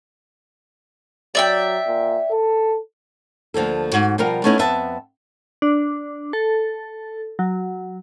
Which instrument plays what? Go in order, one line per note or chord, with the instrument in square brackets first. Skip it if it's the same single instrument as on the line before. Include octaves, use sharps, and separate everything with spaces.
[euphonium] F#3 [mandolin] D5 E5 G5
[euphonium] A#2
A4
[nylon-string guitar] D2 F3 A#3 A4
G#2 F#4
B2 F3 G3 F4 A#4
A3 B3 C#4 D#4 E4
F2 B3 E5 A5
[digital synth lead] D4
A4
F#3